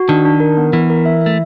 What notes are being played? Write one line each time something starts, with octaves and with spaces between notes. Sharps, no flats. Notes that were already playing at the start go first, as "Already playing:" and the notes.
Already playing: F#4
D#3 D4
D4
A#4
B3
E3 B3
A#4
E5
E5
A3